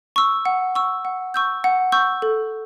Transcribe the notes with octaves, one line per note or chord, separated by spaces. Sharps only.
C#6 E6
F#5
C#6 E6
F#5
C#6 E6 G6
F#5
C#6 E6 G6
A4